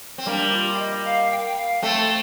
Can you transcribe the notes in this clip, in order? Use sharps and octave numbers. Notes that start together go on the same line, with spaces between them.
C4
G3 A#3 D4
G4
F4
F5
D#5
F5
G5
F5
G5
F5
A3 C4 G5